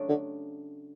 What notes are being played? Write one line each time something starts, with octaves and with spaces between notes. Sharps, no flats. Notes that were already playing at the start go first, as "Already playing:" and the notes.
Already playing: C#3 F#3 A3 D4 G4
D3